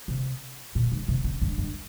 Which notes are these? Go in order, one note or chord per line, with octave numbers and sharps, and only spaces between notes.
C3
A#2
G#2
C3
C#3
G2
G2